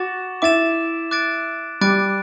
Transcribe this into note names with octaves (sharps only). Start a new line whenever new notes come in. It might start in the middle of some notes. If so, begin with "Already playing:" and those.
Already playing: F#4 D6 A6 E7
E4 D6 A6 E7
D6 F#6 A6 D7
G3 D6 F#6 A6 D7